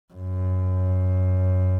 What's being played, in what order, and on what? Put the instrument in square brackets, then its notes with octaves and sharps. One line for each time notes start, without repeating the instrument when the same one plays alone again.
[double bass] F#2